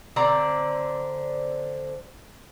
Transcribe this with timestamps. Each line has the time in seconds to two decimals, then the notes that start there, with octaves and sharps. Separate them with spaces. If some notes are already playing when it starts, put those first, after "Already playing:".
0.16 D3 C4 D5 A#5